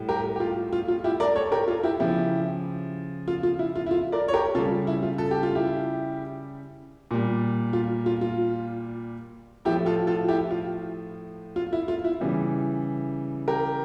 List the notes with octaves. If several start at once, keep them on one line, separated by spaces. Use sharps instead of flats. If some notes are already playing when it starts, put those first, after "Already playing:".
Already playing: A2 G3
G4 A#4
G4
F4
F4
F4
E4 G4
A#4 D5
A4 C#5
G4 A#4
F4 A4
E4 G4
C#3 F3 E4 G4
F4
F4
E4
F4
E4
F4
A#4 D5
C#5
G4 A#4
C#3 G3 F4 A4
E4
F4
A4
G4
F4
E4 G4
A#2 G3
F4
F4
F4
A2 F3 E4 G4
F4 A4
F4 A4
E4 G4
F4
F4
E4
F4
E4
C#3 E3 G3
G4 A#4